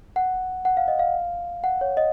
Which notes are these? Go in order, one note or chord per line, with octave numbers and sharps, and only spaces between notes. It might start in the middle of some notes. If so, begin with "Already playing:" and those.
F#5
F#5
F5
D#5
F5
F#5
C#5
D#5